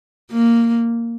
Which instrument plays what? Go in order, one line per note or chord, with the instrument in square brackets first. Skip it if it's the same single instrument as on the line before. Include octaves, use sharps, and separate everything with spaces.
[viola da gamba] A#3